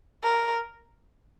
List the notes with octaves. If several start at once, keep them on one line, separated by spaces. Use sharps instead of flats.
A#4